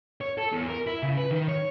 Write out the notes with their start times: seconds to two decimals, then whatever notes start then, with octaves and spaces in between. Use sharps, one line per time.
0.21 C#5
0.38 A4
0.53 E2
0.69 A#4
0.87 E4
1.03 C#3
1.17 B4
1.31 D#3
1.48 C#5